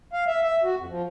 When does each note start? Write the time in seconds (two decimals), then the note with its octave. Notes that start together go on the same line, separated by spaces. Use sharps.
0.13 F5
0.27 E5
0.43 E5
0.64 F#4
0.77 F2
0.89 F3